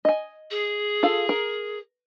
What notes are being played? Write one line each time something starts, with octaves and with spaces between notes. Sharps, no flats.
D#5 G#5
G#4
F4 A4 F5
A#4